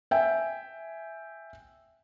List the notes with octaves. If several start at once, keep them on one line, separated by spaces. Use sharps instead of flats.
E5 G5 G#5